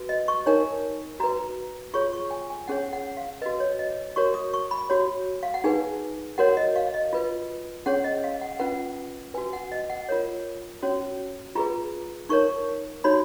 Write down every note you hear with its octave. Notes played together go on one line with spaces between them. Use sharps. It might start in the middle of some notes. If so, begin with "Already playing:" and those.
Already playing: F#4 B4
D#5
C#6
D#4 A#4 C#5 G#5
F#4 B4 A#5
F4 G#4 C#5 C#6
C#6
G#5
G#5
C#4 G#4 C#5 F#5
F#5
F5
F#4 B4 D#5
C#5
D#5
F#4 A#4 C#5 C#6
D#6
C#6
B5
F#4 C#5
F5
F#5
D#4 G#4 B4 G#5
F#4 A#4 C#5 F#5
D#5
F5
D#5
F4 B4
C#4 G#4 C#5 F#5
D#5
F5
F#5
C#4 F4 B4 F#5
F#4 B4 G#5
F#5
D#5
F#5
F4 A#4 C#5
C#4 F#4 C#5
F4 G#4 B4 A#5
D#4 A#4 C#5 C#6
D#4 F#4 C#5 B5